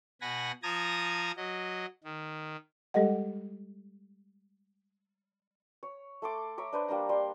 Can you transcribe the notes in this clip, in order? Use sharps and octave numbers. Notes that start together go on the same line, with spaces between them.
B2 F#5 G#5 B5 A#6
F3 A5 A#5 D#6 G#6 A#6
F#3 D#5
D#3
G3 G#3 G4 A4 D#5 F#5
C#5
A3 A4 C6 D6
C#5 E5 A#5 D6
D4 B4 C5
G3 A#3 D4 A#5
G3 C6